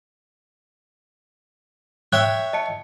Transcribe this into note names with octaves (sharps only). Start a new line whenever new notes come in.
C#5 E5 G5 F#6
D#5 A5 C#7